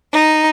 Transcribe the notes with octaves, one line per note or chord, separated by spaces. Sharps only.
D#4